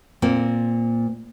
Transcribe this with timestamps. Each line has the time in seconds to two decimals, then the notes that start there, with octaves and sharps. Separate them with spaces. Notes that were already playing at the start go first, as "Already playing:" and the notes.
0.22 A#2 A#3 C4